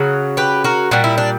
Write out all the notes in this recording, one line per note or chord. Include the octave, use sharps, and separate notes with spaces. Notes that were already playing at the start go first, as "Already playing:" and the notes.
Already playing: C#3 F#3
G4 B4
F#4 A#4
A#2 G3 F#4
E4
D4